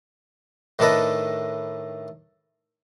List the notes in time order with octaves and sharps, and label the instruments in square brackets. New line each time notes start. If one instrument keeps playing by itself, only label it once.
[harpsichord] A2 D#3 D4 A4 B4 D#5